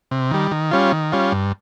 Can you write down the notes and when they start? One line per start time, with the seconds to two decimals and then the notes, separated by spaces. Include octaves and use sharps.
0.11 C3
0.31 D#3 G3
0.51 D#3
0.71 G3 C#4 F4
0.92 D#3
1.12 G3 C#4 F4
1.32 G2